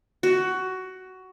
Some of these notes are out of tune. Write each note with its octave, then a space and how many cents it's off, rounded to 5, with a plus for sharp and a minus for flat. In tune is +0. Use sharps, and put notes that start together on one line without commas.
F#4 +15